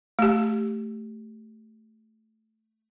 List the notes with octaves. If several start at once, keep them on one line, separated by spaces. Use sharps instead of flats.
A3 G4